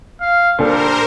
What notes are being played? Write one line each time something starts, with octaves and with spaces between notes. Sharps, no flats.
F5
A#2 G3 D4 A4 A#4 C5